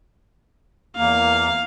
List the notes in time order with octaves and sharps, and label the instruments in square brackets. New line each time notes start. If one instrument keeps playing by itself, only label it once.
[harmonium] E2 A#3 [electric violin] F5